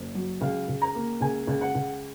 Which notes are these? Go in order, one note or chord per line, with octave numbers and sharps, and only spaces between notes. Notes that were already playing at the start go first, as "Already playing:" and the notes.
Already playing: F#1
F#3
C#2 F5
C#2
A#5
A#3
C#2 G#5
C#2
F#5
C#2